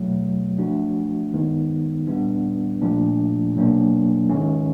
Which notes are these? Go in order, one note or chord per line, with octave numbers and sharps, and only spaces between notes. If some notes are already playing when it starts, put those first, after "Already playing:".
Already playing: B2 F#3 A3
F3 A3 D4 F#4
G2 D#3 G#3 B3 D#4
A#2 G3 B3 D4
A#2 F3 A3 D4
B2 F#3 A#3 D4
G#2 D#3 G#3 C#4